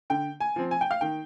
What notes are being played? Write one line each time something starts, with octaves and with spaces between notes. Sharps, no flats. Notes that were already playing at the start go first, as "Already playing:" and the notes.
D3 G5
G#5
F3 C4
G#5
G5
F5
D#3 G5